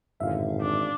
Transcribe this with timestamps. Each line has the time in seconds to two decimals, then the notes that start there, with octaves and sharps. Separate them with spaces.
0.20 G#1 F#2 A2 D3 E5 F5
0.61 D4